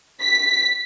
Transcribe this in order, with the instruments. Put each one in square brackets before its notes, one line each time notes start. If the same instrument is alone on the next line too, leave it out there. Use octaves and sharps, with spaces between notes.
[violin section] B6